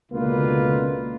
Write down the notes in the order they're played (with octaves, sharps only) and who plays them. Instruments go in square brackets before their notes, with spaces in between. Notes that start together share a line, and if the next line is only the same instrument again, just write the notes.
[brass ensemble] C#2 B2 D3 A#3 F4 B4